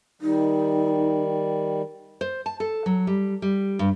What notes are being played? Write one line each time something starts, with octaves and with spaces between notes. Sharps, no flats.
D#3 G3 D#4
C5
A5
A4
F#3
G3
G3
G2